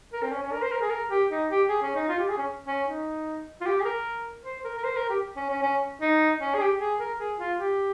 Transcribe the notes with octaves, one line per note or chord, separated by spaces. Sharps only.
A#4
C4
C#4
C#4
A#4
C5
A#4
G#4
A#4
G4
D#4
G4
G#4
C#4
D#4
F4
G4
G#4
C#4
C#4
D#4
F4
G4
G#4
A#4
C5
A#4
A#4
C5
A#4
G4
C#4
C#4
C#4
D#4
C#4
G#4
G4
G#4
A#4
G#4
F4
G4